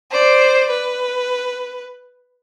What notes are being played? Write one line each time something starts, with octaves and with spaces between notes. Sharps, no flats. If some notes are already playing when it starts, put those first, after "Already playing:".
C5 D5
B4